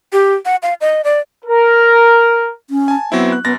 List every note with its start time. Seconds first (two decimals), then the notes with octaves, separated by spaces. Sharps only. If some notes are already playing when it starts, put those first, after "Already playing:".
0.12 G4
0.45 F#5
0.63 F5
0.81 D#5
1.04 D5
1.44 A#4
2.69 C#4
2.88 G#5 A5
3.12 F#3 B3 C4 E4
3.32 F#6
3.44 F#2 B3 A6 A#6